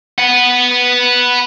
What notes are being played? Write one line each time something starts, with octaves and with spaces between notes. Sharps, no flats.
B4 F#5